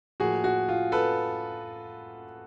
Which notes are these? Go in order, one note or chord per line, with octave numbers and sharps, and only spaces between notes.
A2 F3 A#3 F#4 G#4
F#4
F4
A4 B4